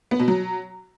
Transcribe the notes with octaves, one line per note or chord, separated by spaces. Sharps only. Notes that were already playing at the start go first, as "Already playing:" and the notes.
B3
B2
F#3